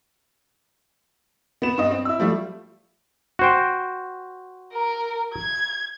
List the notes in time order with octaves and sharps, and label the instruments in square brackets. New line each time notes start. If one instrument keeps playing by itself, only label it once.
[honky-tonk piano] B3 E7
G2 D#5
C4
E4 E6
F3 G3 A3
[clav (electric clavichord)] F#4 C5 G5
[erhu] A#4
G#6